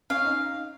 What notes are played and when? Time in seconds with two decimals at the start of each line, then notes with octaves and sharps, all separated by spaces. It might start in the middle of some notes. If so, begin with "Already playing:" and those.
0.10 C#4 F5
0.25 D#4